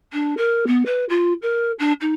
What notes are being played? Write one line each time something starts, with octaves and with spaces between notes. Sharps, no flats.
D4
A#4
B3
B4
F4
A#4
D4
D#4